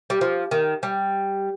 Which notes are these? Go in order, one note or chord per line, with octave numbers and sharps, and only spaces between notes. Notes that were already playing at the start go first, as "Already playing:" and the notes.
G3
F3
D#3
G3